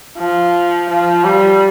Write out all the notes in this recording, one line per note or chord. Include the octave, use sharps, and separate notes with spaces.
F3
F3
G3